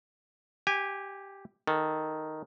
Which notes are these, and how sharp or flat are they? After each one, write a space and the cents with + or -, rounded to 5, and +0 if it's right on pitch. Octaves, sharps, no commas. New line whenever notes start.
G4 +0 G#5 -25
D#3 +0 A4 +0